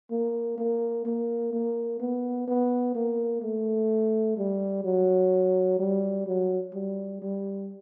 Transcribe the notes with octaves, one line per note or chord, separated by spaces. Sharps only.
A#3
A#3
A#3
A#3
B3
B3
A#3
A3
G3
F#3
G3
F#3
G3
G3